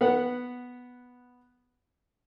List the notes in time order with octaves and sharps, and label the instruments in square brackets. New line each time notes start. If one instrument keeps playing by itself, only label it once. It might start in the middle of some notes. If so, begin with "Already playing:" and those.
[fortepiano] B3 F#5